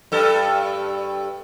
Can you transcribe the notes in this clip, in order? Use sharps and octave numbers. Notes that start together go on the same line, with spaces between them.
G2 A4